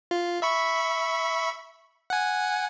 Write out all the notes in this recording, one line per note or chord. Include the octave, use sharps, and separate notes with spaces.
F4
E5 B5 C#6
F#5 G#5